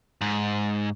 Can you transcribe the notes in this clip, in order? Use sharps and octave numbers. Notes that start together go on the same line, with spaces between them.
G#2